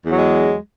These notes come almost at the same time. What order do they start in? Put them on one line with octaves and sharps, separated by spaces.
E2 F#3 G#3